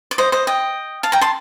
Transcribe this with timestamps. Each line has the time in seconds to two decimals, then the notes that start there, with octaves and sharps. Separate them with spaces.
0.11 D5
0.18 C5 D#5
0.32 C5 D#5
0.47 D#5 G5
1.03 F5 A5
1.12 G5 A#5
1.21 A5 C6